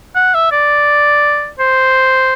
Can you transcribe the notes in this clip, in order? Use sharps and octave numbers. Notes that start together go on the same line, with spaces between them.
F#5
E5
D5
C5